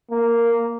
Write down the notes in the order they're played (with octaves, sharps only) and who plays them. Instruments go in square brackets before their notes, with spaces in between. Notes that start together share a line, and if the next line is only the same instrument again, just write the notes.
[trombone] A#3